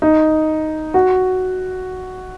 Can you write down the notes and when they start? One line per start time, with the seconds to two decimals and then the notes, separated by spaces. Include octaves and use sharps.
0.02 D#4
0.94 F#4